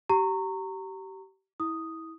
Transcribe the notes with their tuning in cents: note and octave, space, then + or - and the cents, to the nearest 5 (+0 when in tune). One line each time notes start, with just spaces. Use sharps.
G4 -30 A#5 -20 C#6 -15
E4 -25 D#6 +0